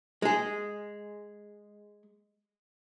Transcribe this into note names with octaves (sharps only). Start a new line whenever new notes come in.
G#3 G#4